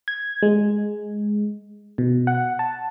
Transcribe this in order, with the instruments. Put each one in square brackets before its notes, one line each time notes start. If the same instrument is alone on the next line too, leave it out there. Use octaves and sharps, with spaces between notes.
[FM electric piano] G#6
G#3
B2
F#5
A5